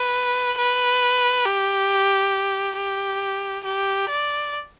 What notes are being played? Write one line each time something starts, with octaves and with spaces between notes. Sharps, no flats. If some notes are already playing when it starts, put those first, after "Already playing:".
Already playing: B4
B4
G4
G4
G4
D5